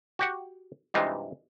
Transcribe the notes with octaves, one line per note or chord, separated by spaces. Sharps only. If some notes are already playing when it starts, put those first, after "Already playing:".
F#4 G4 F#5
G2 C3 E3 G#3 D#4 F4